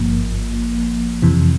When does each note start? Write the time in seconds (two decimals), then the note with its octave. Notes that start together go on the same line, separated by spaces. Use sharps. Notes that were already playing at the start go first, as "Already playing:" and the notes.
Already playing: G#1 G2 F3 A#3
1.22 F2 C3 E3